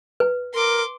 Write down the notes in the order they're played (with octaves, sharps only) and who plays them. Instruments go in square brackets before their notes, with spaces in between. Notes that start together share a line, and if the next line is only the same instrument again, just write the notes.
[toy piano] B4
[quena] A#4 [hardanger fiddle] C6 D6